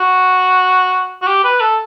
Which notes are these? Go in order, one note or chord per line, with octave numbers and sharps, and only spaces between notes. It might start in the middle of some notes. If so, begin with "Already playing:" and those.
Already playing: F#4
F#4
G4
B4
A4